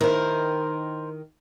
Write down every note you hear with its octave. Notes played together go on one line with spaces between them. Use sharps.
D#3 E4 A#4 C5